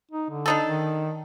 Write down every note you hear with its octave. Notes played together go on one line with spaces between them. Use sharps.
D#4
D3
D4 D#4 A4
D#3